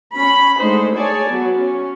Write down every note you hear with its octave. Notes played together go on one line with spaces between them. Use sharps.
C#4 B5
D3 G#3 A3 D#4 C5
G#4 C#5 D5 G#5 A5
F#3 B3
C#4